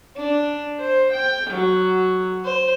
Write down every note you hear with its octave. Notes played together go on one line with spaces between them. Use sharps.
D4
C5
G5
F#3
C5